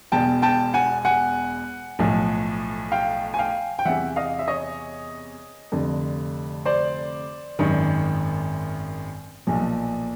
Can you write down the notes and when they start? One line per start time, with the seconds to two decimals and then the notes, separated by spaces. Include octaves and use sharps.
0.12 E1 E2 B2 G5 A5
0.42 G5 A5
0.74 F#5 G#5
1.05 F#5 G#5
1.99 B1 A2 F3
2.92 F5 G5
3.34 G#5
3.39 F5 G5
3.79 G5
3.85 E2 C3 E3 E5 F#5
4.16 D#5 F5
4.39 E5
4.48 C#5 D#5
5.72 F1 F2 D3
6.66 C5 D5
7.59 G#1 F#2 D#3
9.47 B1 A#2 F3